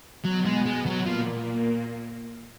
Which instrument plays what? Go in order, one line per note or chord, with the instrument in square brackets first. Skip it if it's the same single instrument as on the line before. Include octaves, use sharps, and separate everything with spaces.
[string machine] B2 B3 [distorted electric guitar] F#3
[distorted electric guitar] G#3
G#3
F#3
[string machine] A#2 A#3 [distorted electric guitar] F3